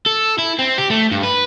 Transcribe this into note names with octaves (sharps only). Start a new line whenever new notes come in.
A4
E4
C4
G4
A3
G2
B4